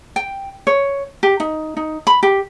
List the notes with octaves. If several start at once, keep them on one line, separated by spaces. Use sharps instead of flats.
G5
C#5
G4
D#4
D#4
B5
G4